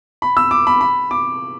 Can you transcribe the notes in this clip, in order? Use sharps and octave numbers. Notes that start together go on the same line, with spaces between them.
B5
E6
D6
B5
B5
D6